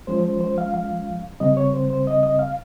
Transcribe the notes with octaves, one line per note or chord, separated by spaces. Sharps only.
F3 G#3 C#4 C5
C5
C5
F5
F5
C#3 G3 C4 D#5
C#5
C5
C5
D#5
D#5
F5